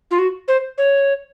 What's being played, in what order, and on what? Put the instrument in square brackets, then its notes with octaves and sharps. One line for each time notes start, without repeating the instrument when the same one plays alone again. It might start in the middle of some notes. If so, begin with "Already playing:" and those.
[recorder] F4
F#4
C5
C#5